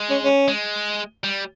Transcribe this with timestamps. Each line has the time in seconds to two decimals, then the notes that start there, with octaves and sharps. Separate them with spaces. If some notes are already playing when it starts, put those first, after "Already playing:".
Already playing: G#3
0.10 C#4
0.24 C#4
0.48 G#3
1.24 G3